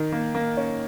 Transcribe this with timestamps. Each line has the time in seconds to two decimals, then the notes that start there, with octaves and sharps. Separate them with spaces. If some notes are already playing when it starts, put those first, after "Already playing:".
Already playing: D#3
0.12 A#3
0.35 A#3
0.57 C#4